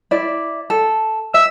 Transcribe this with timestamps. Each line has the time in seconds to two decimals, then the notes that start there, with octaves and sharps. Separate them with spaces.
0.11 E4 D5
0.70 A4
1.34 E5 E6